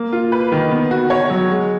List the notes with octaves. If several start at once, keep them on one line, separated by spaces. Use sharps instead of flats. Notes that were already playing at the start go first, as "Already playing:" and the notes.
Already playing: A#3
F4
B4
D#3
B3
F#4
C#5
F#3
G#3